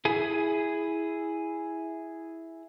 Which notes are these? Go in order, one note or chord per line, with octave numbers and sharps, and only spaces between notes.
E4 G#4